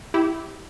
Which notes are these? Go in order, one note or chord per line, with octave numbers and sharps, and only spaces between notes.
E4 G4